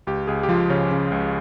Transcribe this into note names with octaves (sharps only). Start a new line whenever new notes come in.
C#2 G4
C#2 G#4
G4
F3 F4
C#3 C#4
C#3
C#2